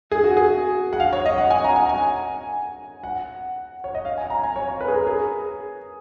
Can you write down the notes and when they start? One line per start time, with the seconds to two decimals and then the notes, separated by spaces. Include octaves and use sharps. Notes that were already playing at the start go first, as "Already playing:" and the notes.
0.12 G#4
0.24 F#4
0.37 G#4
0.93 F#5
1.00 F5
1.13 C#5
1.26 D#5
1.38 F#5
1.50 G#5
1.64 A#5
1.76 G#5
1.89 G#5
3.03 F#5
3.84 C#5
3.95 D#5
4.05 F5
4.18 G#5
4.30 A#5
4.44 G#5
4.56 C#5
4.68 C#5
4.81 B4
4.88 G#4
4.94 A#4
5.07 G#4